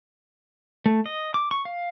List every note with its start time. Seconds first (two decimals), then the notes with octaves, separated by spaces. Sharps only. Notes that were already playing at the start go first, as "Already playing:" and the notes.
0.86 A3
1.06 D#5
1.34 D6
1.51 C#6
1.65 F5